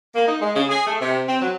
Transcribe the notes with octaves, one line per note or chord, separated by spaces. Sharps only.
A#3
D#4
G#3
C#3
G#4
A3
C3
C4
F#3